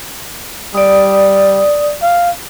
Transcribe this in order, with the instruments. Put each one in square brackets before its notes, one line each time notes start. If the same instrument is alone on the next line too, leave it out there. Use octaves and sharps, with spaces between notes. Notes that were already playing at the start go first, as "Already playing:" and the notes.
[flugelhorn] G3 [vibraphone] D5 D#6
[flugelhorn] F5